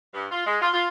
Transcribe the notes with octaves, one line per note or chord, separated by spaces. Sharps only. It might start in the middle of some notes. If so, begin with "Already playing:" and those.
G2
F4
G#3
F4
F4